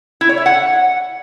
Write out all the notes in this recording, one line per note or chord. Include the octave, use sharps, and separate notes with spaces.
E4
C#5
E5
F#5